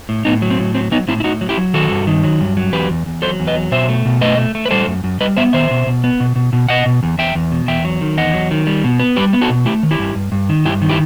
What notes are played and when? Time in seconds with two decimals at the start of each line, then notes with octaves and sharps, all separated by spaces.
0.09 A2
0.25 A2 B3 D#4
0.42 F#3
0.50 C4
0.59 A2
0.75 F#3 C4
0.91 F#3 B3 D#4
1.08 A2 C4 E4
1.20 E4
1.24 A2 D#4 F#4
1.41 F#3
1.49 E4 G4
1.57 F#3
1.74 D#3 F#4 A4
1.91 G2
2.07 D#3
2.24 F#3
2.41 G2
2.57 F#3
2.73 E2 G4 B4
2.90 E2
3.06 E2
3.22 F#3 A4 C5
3.40 E2
3.47 B4 D#5
3.55 F#3
3.71 B2 C5 E5
3.89 A3
4.06 B2
4.21 A3 B4 D#5
4.38 A3
4.55 A3
4.66 B4
4.71 G3 A4 C5
4.87 F#2
5.04 F#2
5.20 G3 B4 D#5
5.37 B3 C5 E5
5.53 D#3 C5 E5
5.71 B2
5.87 B2
6.04 B3
6.20 B2
6.36 B2
6.53 B2
6.69 B2 D#5 F#5
6.86 B2
7.03 E2
7.18 E2 E5 G5
7.35 E2
7.52 B2
7.68 E2 E5 G5
7.85 F#3
8.01 D#3
8.17 E2 D#5 F#5
8.34 F#3
8.51 D#3
8.67 G3
8.84 B2
8.99 B3
9.16 G3 G4 B4
9.33 B3
9.42 F#4 A4
9.50 B2
9.65 A3 E4 G4
9.83 D#3
9.91 E4 G4
9.99 G2
10.15 G2
10.32 G2
10.49 D#3
10.65 G2 E4 G4
10.82 D#3
10.89 E4 G4